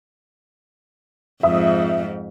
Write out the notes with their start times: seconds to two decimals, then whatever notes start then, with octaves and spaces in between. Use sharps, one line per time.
1.43 F2 G#2 E5 D#6